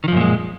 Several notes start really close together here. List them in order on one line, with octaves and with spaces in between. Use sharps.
D#3 F3 F#2 A#2 G#3